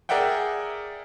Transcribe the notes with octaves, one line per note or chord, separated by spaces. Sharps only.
G#4 A#4 D5 E5 F#5 G5